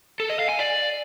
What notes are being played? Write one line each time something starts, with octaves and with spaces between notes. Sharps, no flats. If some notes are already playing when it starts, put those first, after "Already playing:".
A4
D#5
F5
G#5
D5